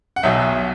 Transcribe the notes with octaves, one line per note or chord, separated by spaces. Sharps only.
F#5
B1 B2 F#3 E5